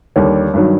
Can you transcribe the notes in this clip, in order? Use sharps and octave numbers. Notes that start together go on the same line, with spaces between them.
D#2 D3 G3 C#5
G2 D#3 F#3